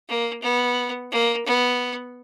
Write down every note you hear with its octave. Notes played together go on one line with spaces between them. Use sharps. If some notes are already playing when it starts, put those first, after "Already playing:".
A#3
B3
A#3
B3